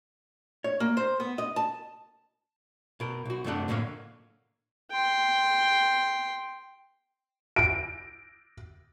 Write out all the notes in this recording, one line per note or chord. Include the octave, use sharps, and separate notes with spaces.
C#5
A#3
C5
B3
D#5
A5
B2 A#4
B1 F#4
F#2 C3 A3 D4 F#5
A2 D3 A#3 C#5 F5
G5 C6
D7